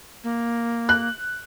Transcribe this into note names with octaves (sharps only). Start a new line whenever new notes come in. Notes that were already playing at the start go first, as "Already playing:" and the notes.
A#3
F#6